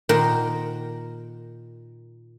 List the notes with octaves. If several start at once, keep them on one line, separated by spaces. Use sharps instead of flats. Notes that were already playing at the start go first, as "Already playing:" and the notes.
A#2 D#3 A#4 C5 F#5 G5